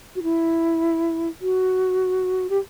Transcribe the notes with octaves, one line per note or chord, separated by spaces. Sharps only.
F#4
E4
F#4
G4